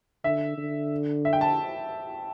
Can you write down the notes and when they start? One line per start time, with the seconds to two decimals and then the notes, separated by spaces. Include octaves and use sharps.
0.24 D3 E5
0.58 D3
1.25 E5
1.33 G5
1.41 A5